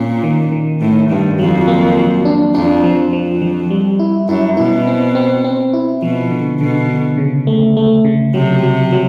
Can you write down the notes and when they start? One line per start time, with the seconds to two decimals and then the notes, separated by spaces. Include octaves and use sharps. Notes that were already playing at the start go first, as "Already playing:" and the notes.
Already playing: A#2 C#4
0.23 D#3
0.52 D#3
0.81 A2 D#3
1.10 G2 D#3
1.39 F2 F#3
1.68 A#3
1.97 F#3
2.25 D4
2.55 F2 D4
2.84 F3
3.13 F2 F3
3.42 F3
3.70 G3
3.99 E4
4.28 F#2 E4
4.57 B2 E4
4.87 C4
5.15 C4
5.44 C4
5.73 E4
6.02 B2 F3
6.31 D3
6.60 B2 D3
6.89 D3
7.18 C#3
7.47 A3
7.77 A3
8.04 C#3
8.34 C3 F#3
8.63 F#3
8.92 F#3